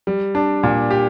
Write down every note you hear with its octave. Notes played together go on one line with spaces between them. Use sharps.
G3
D4
A#2
G4